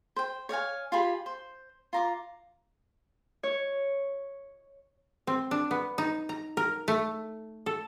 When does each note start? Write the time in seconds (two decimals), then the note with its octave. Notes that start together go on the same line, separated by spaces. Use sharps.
0.16 C5 G5
0.49 C#5 D5 F5 G#5
0.92 F4 G4 G#4 B5
1.26 C5
1.93 F4 A#5 D6
3.43 C#5
5.27 C4
5.51 D4
5.71 B3
5.98 D#4
6.29 A#5
6.57 A#4
6.88 A3
7.66 A4